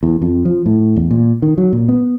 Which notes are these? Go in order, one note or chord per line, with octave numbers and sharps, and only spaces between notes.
E2
F2
F3
A2
E2
A#2
D#3
F#3
A#2
B3